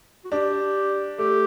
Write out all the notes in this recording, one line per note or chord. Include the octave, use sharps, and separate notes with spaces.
F#4
D4 G4
A3 G4